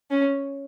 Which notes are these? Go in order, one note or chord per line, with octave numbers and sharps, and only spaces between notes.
C#4